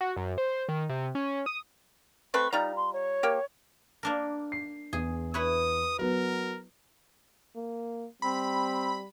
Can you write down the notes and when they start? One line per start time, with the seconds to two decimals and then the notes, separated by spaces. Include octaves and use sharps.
0.01 F#4
0.17 F#2
0.38 C5
0.69 D#3
0.89 C3
1.15 C#4
1.46 D#6
2.34 A3 C4 B4 C#6
2.53 G3 D#4 F4 A#5
2.76 C6
2.93 C#5
3.23 A#3 G4
4.03 A#3 D4 A#4
4.52 C7
4.93 E2 G#4
5.34 E4 B4 C#5 D#6
5.99 F#3 B3 A#4
7.56 A#3
8.22 G3 C4 B5